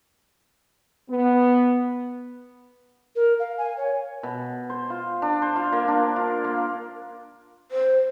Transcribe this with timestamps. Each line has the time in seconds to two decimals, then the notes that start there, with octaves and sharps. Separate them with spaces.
1.10 B3
3.15 A#4
3.39 F5
3.58 G#5
3.77 C#5
4.23 B2
4.70 C5
4.90 F4
5.22 D4
5.42 C5
5.56 F4
5.73 A#3
5.88 D4
6.16 F4
6.44 A#3
7.71 C5